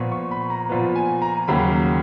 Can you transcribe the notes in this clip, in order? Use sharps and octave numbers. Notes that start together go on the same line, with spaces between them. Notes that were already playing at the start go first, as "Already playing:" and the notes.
Already playing: A#2 F3 B3 C#6
C#6
B5
A#5
A#2 F3 B3
G#5
A#5
D#2 C#3 F#3 A#3 B5